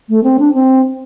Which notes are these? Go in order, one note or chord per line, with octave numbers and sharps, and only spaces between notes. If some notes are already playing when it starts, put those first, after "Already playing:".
A3
C4
D4
C4